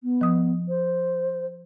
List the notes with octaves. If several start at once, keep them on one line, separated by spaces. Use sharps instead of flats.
B3
F3 D#6
C5